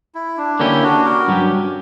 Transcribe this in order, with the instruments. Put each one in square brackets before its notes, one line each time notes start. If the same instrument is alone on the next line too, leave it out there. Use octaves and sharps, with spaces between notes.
[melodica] E4
D4
[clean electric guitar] D3 A#3 C#4 G4 [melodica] E4
[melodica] D4 F#4
F#4 A#4
[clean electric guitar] G2 F#3 C#4 G4